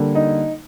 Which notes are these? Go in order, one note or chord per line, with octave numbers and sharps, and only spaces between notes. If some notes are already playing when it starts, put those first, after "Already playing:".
Already playing: D3 G3 A#3
D#4